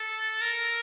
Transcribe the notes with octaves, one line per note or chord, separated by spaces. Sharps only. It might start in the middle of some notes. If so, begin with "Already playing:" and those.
Already playing: A4
A#4